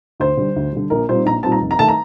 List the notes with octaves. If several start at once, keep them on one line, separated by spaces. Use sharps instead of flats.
D2 C5
D3 G3
D2
D3 G3
A#1 A#4
A#2 G3 C4 D#4 C5
A#1 A#5
A#2 G3 C4 D#4 A5
A#5
F1
A#5
D#3 A3 A5
A#5